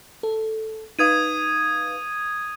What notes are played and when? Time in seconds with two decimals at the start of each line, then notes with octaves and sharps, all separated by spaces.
0.23 A4
0.99 D#4 B4 F5 D#6 G#6 D#7